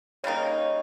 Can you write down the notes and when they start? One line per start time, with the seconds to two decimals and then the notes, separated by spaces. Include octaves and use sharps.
0.24 C#3 G3 A#3 D#4 C#5
0.47 C#5